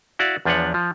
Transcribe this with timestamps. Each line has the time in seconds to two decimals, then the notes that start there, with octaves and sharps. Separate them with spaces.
0.19 E4 F#4 D5 F5
0.45 E2 F3 D4 B4 C#5 F#5
0.74 F3